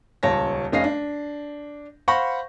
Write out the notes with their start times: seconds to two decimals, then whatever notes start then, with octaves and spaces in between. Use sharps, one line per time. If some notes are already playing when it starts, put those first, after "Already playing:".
0.23 D#1 C#2 C#5 A5 A#6
0.72 F1 C#4 D#5 F5 A#6 C7
0.84 D4
2.08 C5 F5 F#5 B5 C#6 A#6